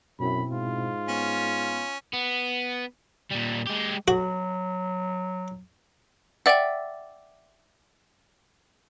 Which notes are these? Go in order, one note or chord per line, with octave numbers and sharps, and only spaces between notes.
F#2 B2 C4 E4 B5
G#2 F4
B3 C#4
B3
A#2 G3
G#3 G4
F#3 F#4
D5 E5 F#5 G5